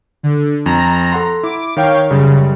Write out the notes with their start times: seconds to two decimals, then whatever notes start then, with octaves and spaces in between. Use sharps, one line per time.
0.23 D3
0.66 F2 A#5
1.12 A4 F#5 C6
1.43 E4 D6
1.77 D#3 C#5 F5 G5
2.11 F#2 C#3 G3